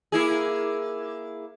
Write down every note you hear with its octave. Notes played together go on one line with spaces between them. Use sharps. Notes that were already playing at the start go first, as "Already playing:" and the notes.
A#3 E4 G#4